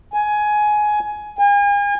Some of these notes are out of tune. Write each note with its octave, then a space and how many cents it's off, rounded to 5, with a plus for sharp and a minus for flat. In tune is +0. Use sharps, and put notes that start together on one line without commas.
G#5 +15
G#5 -40